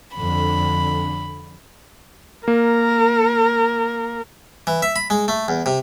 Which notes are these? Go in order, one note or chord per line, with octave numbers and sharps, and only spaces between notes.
F2 D3 B5
A#3 A#4
E3
E5
B5
G#3
A3
E2
C3